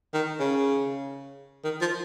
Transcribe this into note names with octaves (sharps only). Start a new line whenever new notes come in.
D#3
C#3
D#3
F3